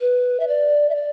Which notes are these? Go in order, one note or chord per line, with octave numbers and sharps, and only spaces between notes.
B4
E5
D5
E5
D5